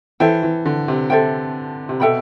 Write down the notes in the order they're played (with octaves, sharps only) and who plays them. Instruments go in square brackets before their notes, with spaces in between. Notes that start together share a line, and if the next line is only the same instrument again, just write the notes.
[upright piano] E3 [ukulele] A4 C5 E5 G5
[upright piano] E3
D3
C3
[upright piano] C3 [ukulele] A4 C5 E5 G5
[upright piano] C3
[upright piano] B2 [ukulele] A4 E5 G5 B5